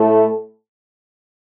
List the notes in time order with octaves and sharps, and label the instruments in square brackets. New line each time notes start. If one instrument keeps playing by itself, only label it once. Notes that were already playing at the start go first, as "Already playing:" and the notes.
Already playing: [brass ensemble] A2 A3